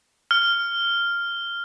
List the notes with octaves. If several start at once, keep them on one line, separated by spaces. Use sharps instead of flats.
F6